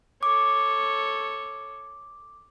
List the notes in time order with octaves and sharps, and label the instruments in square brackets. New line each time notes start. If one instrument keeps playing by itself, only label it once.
[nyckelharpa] A4 C#5 [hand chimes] D6